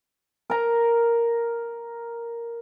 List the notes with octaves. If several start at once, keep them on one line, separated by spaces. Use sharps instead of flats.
A#4 A#5